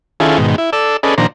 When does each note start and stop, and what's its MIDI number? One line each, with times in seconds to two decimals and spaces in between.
0.20 0.38 51
0.20 0.38 61
0.20 0.38 64
0.20 0.38 65
0.20 0.38 68
0.20 0.38 69
0.38 0.56 44
0.38 0.56 47
0.38 0.56 51
0.58 0.70 64
0.73 0.97 69
0.73 0.97 74
0.73 0.97 88
1.03 1.14 61
1.03 1.14 68
1.03 1.14 69
1.03 1.14 71
1.03 1.14 74
1.03 1.14 75
1.18 1.27 46
1.18 1.27 51
1.18 1.27 53
1.18 1.27 62
1.18 1.27 72
1.18 1.27 82